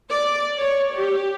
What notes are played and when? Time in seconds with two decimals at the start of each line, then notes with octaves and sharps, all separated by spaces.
0.11 D5
0.61 C#5
0.95 G4